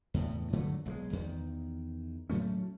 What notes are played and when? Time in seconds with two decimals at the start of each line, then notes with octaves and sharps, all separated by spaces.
0.14 E2 A2 C#3
0.53 G2 D3 F#3 A3
0.86 B1 F#3 G#3
1.13 E2 D#3
2.30 A2 F#3 A3 C#4